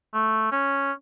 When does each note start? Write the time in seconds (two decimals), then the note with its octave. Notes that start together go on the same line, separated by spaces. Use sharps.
0.14 A3
0.52 C#4